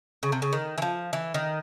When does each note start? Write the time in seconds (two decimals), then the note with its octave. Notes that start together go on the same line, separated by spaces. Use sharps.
0.23 C#3
0.32 C3
0.42 C#3
0.53 D#3
0.78 E3
0.82 F3
1.13 E3
1.34 D#3